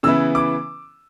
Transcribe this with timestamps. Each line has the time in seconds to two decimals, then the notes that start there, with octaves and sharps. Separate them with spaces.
0.03 C#3 E3 B3 E4 E6
0.35 D6